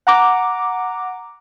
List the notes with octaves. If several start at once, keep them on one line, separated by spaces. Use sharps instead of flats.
F#5 A#5 D6